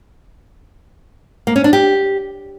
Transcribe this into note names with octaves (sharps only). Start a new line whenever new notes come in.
A#3
C#4
D4
G4